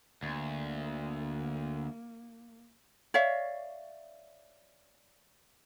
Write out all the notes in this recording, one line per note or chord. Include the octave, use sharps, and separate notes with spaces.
D2 A#3
C#5 D5 E5 F5